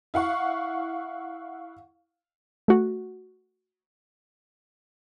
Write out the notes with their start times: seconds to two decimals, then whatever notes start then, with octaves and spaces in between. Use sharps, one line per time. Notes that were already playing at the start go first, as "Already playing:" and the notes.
0.14 E4 F5 F#5 C#6
2.68 A3 F#4